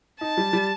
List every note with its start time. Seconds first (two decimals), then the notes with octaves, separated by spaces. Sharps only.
0.21 D#4 A5
0.37 G3
0.53 G3